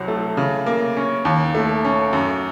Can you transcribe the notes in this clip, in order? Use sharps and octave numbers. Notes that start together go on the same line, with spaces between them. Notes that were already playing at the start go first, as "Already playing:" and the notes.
Already playing: C2 F#3
A3
C#3
A#3
C#4
D#2
A3
C#4
F#2